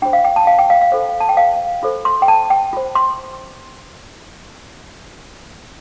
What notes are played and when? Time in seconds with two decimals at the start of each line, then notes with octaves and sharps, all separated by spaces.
0.02 D4 F4 C5 G5
0.13 F5
0.25 G5
0.36 A5
0.47 F5
0.59 G5
0.70 F5
0.81 F5
0.92 F4 A4 C5
1.20 A5
1.29 G5
1.37 F5
1.83 F4 A4 C5
2.05 C6
2.22 G5
2.28 A5
2.50 G5
2.73 F4 C5
2.95 C6